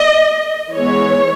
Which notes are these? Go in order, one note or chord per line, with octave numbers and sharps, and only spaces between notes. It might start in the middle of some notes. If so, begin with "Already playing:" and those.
Already playing: D#5
E3 G#3 B3 C#5